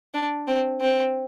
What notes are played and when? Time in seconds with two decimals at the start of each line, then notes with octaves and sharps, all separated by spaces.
0.14 D4
0.47 C4
0.81 C4